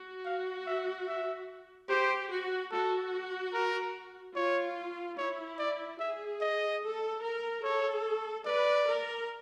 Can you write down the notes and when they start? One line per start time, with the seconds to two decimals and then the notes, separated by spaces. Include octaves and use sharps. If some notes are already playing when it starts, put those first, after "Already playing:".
Already playing: F#4
0.25 F5
0.67 E5
1.07 E5
1.89 G4 C5
2.30 F#4
2.71 F#4 A4
3.53 A#4
4.35 F4 C#5
5.18 E4 C#5
5.58 D5
5.99 G#4 E5
6.41 D#5
6.82 A4
7.22 A#4
7.63 A4 C#5
8.45 B4 D5
8.86 A#4